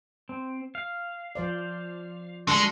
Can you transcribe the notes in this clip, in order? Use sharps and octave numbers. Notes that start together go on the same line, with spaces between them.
C4
F5
F3 C5 D5
D3 G#3 D4 F#4 A4